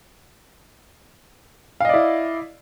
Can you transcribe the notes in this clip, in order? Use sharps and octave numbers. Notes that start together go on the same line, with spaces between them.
E4 D5 D#5 F5